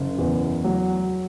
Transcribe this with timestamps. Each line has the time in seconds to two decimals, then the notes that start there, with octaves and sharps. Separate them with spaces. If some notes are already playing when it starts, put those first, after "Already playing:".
Already playing: F#1
0.18 E2
0.64 F#3